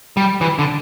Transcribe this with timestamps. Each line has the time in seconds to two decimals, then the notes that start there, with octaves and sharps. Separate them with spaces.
0.17 G3
0.41 E3
0.59 D3